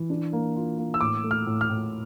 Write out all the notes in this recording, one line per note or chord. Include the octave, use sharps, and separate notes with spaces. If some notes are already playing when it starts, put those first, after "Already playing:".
Already playing: E3
D4
A#3
F4
A#3
E6
A2 D6
A3
F6
A2
F6
A2